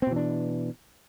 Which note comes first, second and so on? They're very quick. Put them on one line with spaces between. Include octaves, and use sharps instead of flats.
C4 B2 E3 D4